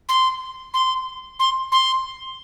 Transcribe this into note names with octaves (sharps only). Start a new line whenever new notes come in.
C6
C6
C6
C6